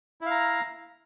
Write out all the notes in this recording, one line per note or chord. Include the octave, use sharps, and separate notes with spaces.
E4 F5 A#5